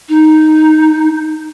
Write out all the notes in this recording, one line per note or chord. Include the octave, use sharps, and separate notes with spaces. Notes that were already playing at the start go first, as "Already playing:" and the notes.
D#4